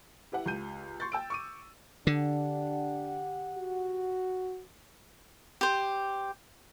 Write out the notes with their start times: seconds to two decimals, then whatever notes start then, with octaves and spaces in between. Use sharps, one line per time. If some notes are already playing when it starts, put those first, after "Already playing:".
0.32 E4 G4 B4 F#5
0.46 C#2 G4 G6 D#7
1.00 C6 C#6 G6 A6
1.12 G5 E6 D7
1.30 C#6 D6 D#7
2.07 D3 D4 G4 F#5
3.58 F#4
5.61 G4 C5